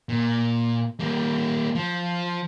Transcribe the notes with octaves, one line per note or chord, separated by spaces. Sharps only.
A#2
G3 A#3
F3